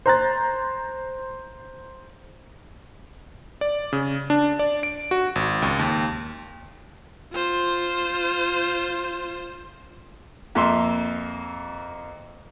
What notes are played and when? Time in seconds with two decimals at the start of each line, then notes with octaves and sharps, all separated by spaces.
0.06 C5 A#5 F#6 A6
3.61 D5
3.93 C#3
4.30 D4
4.59 D5
4.83 D7
5.11 F#4
5.35 G#1
5.62 C#2
5.79 D#2
7.33 F4 C5
10.55 F2 A#3 E5 C6